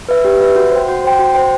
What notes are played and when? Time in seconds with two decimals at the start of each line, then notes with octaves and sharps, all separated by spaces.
0.09 B4 E5
0.25 G4
0.41 B4 E5
0.56 F#4
0.72 C5 G5
0.88 F#4
1.04 C5 G5
1.19 F#4
1.35 C5 G5